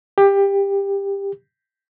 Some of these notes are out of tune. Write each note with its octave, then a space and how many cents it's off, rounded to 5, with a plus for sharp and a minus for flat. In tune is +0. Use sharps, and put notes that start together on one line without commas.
G4 +20